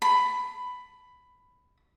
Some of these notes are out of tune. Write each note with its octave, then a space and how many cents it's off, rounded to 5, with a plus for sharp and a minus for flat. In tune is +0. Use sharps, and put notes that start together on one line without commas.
B5 +10